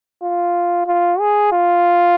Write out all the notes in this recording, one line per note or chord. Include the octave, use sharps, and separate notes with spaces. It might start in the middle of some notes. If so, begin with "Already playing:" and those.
F4
F4
G#4
F4